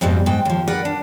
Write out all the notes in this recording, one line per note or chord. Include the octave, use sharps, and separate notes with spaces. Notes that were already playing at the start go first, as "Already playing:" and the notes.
F2 G#2 B2 G3
G#2 G5
D#2 F3
A#4 B4 D5 F#5
D4